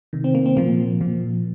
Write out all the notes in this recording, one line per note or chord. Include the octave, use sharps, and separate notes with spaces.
C3 D#3
C4
A#3
C4
A#2 F3 A#3
A#2 F3